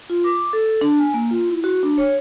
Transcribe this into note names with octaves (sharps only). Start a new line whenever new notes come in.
F4
D6
A4
D4
G#5
A#3
F4
E4
F#4
D4
C#5